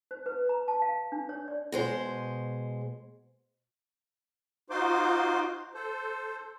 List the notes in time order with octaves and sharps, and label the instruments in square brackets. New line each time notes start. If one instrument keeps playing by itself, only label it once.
[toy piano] C5
B4
A#5
A5
F5
D4
C#5
D5
[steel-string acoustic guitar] B2 G#3 C5
[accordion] D#4 F4 F#4 C5 C6 D6
A4 C5